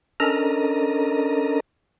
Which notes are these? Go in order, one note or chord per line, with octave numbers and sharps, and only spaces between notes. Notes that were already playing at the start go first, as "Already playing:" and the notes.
C#4 D4 A4 A#4 D#5 A#5